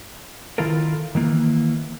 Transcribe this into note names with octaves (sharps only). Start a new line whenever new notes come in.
D#3 E4 F4 A4 A#4
D#3 E3 A#3